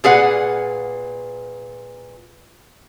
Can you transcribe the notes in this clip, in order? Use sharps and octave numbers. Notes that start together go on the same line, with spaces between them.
A#2 G#4 B4 F#5